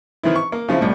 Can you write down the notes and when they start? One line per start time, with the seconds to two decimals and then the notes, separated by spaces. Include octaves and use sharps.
0.23 D#3 E3 C4 E4
0.36 C#6
0.52 A#3
0.69 C#3 F3 C4 E4
0.81 C2 A2